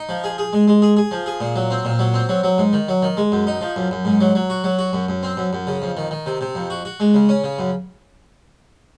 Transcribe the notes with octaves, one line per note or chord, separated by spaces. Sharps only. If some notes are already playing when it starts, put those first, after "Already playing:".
Already playing: D#4
F3
G#4
G#4
G#3
G#3
G#4
G#4
F3
G#4
A#2
F#3
C4
A#2
F#3
C4
F#3
F#3
G#2
D#3
F#3
D#3
G#3
F#2
D#4
F3
F#2
F#2
G#2
F#3
F#3
F#4
F#3
F#4
F#2
F#2
C4
F#2
F#2
C#3
F2
D#3
D#3
C3
C3
F2
F#4
F#4
G#3
C#3
C#4
C#3
F#2